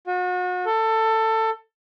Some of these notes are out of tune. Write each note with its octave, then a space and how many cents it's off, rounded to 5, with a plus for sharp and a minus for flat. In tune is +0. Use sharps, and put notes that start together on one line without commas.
F#4 -35
A4 +20